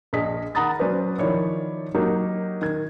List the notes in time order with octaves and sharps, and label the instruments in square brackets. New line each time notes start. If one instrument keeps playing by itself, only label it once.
[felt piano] A#1 G#4 D#5 B6
D#3 F#5 A#5 B5 D#6 A6
F#3 C#4 B4 C5 D5
D#3 F3 E4 C#5 D5
F#3 A#3 D#4 G4
D#3 G#6